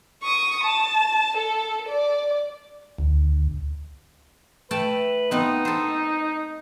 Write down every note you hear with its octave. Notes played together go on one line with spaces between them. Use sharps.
C#6 D#6
A5
A4
D5
D2
A3 B4 G5 A5
B3 C4 D#4
A4 C5